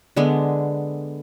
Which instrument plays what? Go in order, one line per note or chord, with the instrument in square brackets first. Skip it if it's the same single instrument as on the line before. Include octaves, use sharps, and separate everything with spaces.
[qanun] D3 G#3 B3